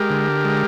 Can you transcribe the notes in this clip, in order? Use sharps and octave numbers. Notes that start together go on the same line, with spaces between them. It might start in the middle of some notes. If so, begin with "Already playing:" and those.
Already playing: G#3 G4 A#4
D3
G#3